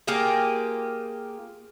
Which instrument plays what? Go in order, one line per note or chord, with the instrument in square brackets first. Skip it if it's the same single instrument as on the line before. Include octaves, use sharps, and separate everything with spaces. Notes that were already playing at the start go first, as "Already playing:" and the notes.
[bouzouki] A#3 F4 G4 G#4